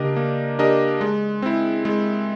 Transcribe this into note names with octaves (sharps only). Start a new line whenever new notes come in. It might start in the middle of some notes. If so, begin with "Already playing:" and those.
Already playing: C#3 A#3 D4 G4 A#4 D#5
A#3
D4 G4 A#4 D#5
G#3
C4 E4
G#3